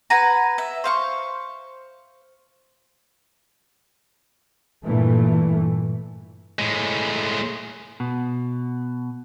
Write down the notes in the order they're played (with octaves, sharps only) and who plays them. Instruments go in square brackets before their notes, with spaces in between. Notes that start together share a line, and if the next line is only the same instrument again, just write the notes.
[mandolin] B4 F#5 G#5 A#5
E5
C5 F5 C#6
[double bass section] G2 A#2 E3 A3
[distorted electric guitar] A2 G#3
[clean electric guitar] B2